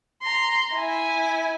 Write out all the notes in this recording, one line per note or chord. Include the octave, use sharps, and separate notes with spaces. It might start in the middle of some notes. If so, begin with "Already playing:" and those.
A#5 C6
E4 G#5